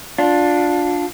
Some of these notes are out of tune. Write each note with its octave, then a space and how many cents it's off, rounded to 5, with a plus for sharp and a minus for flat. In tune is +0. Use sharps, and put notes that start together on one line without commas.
D4 +0 F4 +20